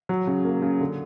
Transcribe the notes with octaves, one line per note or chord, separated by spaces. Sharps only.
F#3
C#3
A#3
C#3
D3